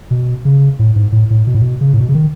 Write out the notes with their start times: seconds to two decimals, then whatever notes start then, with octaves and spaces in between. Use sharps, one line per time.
0.11 B2
0.45 C#3
0.79 A2
0.96 G#2
1.12 A2
1.30 A2
1.47 B2
1.55 A2
1.62 B2
1.81 C#3
1.93 A2
2.00 B2
2.09 C#3
2.14 D#3